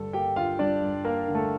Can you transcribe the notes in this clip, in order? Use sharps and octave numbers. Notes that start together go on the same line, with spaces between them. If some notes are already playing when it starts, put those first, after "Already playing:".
Already playing: G2 D3 G3 A4
A#3 G4 G5
D3 F4 F5
G3 D4 D5
G2
A#3 A#4
D3
A3 A4